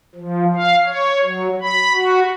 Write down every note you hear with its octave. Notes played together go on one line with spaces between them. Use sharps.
F3
F5
C#5
F#3
B5
F#4